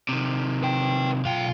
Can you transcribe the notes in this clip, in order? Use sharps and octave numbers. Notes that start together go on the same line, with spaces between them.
C3 D#3
B4 G5
B1 F4 G5